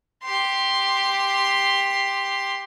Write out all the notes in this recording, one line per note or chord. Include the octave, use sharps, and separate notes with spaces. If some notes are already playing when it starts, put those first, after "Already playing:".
G4 C6